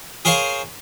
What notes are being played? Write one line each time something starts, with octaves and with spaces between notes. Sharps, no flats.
G#4 A#4 C5 C#5 F5 G#5